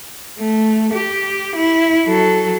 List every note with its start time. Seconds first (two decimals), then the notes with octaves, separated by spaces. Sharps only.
0.39 A3
0.94 G4
1.56 E4
2.06 F#3 A4